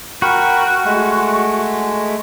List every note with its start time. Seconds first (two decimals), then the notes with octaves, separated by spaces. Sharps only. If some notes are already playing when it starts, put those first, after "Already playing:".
0.22 F#4 A#4 G5 B5
0.85 G#3 A3